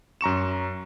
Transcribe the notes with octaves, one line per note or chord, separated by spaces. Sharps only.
F#2 A#5 C#6 E7